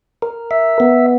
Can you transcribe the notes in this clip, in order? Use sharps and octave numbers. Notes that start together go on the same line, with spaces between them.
A#4
E5
B3